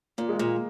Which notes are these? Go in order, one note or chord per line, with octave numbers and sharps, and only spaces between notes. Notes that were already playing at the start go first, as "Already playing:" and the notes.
A#2 A#3
G#3
A#2 A#3